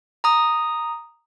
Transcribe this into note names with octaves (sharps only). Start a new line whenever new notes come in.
A#5 D#6